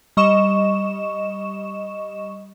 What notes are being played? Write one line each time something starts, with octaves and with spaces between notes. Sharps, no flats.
G3 D#5 C#6 E7